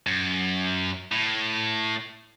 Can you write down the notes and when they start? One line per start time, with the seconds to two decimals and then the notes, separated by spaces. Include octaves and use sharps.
0.07 F#2
1.12 A2